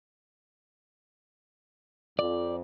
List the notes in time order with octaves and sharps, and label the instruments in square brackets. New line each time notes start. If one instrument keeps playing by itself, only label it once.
[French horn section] F2 [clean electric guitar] D5